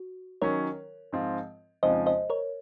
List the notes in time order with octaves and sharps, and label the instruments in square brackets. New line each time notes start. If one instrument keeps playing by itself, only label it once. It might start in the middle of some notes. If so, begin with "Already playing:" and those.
Already playing: [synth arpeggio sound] F#4
[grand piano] D#3 F#3 C#4 [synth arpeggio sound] A#4 C#5
[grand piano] G#2 F3 C4 F4
[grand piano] F2 C#3 F3 G#3 D#4 [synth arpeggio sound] C5 D#5
[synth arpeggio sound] C5 D#5
A#4 C#5